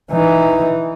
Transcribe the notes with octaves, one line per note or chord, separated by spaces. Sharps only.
E3 D#4